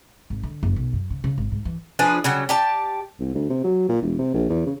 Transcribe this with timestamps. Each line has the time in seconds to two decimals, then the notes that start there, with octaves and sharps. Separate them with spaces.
0.30 G#1
0.43 D3
0.63 F#1
0.76 B1
0.93 F#2
1.10 C#3
1.24 C#3
1.38 G#1
1.52 G#2
1.65 E3
1.99 F3 D4 G#4 B4
2.24 C#3 F#3 G3
2.49 G4 D5 A5
3.20 C2
3.34 D2
3.50 C3
3.64 F#3
3.89 A#2
4.02 E1
4.18 C3
4.34 A#1
4.49 E2
4.66 C#3